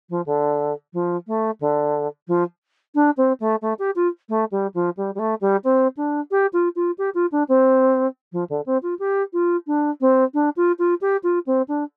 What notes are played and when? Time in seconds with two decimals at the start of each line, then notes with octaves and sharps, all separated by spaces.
0.10 F3
0.26 D3
0.93 F3
1.27 A3
1.60 D3
2.28 F3
2.95 D4
3.17 C4
3.40 A3
3.62 A3
3.79 G4
3.96 F4
4.29 A3
4.52 G3
4.74 F3
4.97 G3
5.15 G3
5.19 A3
5.41 G3
5.64 C4
5.97 D4
6.31 G4
6.53 F4
6.76 F4
6.98 G4
7.15 F4
7.32 D4
7.49 C4
8.32 F3
8.50 D3
8.66 C4
8.83 F4
8.99 G4
9.33 F4
9.67 D4
10.01 C4
10.34 D4
10.57 F4
10.79 F4
11.01 G4
11.23 F4
11.46 C4
11.68 D4